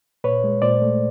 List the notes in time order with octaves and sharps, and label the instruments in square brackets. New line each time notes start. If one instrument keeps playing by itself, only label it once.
[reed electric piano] A#2 B4 C#5
G#3
A#2 C5 D5
A3